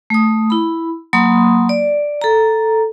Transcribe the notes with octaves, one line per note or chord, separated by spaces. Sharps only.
A3 D#6
E4 B5
F#3 A#3 B5 C6 D#6
D5
A4 A#5